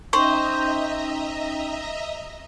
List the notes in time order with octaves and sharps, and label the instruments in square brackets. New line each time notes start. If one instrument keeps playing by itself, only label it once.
[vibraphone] C#4 D#4 G5 [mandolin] C5 [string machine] D#5 E5 A#5 [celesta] C#6